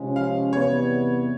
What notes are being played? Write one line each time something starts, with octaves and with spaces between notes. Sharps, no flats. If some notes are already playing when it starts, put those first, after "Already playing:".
Already playing: C3 F3 G#3 C#4
F5
E2 C3 E3 G3 B3 C#5